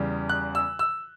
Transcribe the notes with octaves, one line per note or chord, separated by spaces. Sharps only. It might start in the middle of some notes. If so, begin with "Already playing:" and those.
Already playing: E2 C#3 G3
F#6
E6
E6